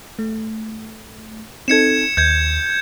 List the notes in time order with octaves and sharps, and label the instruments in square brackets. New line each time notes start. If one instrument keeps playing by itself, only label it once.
[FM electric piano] A3
[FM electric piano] C4 D#4 A4 [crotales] G#6 C#7 E7
[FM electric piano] D#2 [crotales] G6 G#6